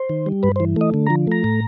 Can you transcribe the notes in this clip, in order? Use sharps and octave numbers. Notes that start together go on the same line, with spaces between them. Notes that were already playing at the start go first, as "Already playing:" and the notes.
Already playing: C5
D#3
G3
G2 B4
C5
E3
A3 D#5
D3
F3 A#5
A3 A#5
A2